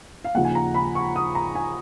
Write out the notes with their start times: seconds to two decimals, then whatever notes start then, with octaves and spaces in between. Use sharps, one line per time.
0.24 F5
0.35 D#2 C#3 F3 F#5
0.45 G#5
0.55 A#5
0.74 B5
0.95 C#6
1.16 D#6
1.35 A#5
1.55 G#5